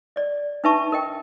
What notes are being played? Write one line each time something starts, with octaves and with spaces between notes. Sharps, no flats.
D5 D#5
D4 D#4 B4 E5 A5 C#6
A#4 D#5 G5